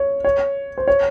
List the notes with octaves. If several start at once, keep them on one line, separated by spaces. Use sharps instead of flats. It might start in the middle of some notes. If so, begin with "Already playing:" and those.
Already playing: C#5
C#5
C5
C#5